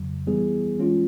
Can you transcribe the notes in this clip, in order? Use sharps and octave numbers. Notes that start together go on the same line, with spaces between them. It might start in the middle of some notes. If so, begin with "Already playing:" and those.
Already playing: F2 C#3 F#3
E3 G3 B3 E4 G#4
E3 G#3 C#4 F4